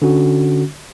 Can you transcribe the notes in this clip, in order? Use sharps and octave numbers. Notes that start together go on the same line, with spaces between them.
D3 C#4 F#4